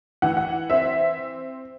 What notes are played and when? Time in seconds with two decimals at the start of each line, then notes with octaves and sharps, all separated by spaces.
0.22 E3 F#5
0.37 F#5
0.70 C4 E5